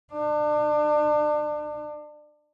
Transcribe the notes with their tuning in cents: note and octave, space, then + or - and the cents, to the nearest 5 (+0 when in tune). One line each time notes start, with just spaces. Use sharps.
D4 +30